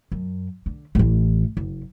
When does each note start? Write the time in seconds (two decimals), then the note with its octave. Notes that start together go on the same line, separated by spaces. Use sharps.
0.12 F#2
0.66 D3
0.95 A1 E3
1.57 F#1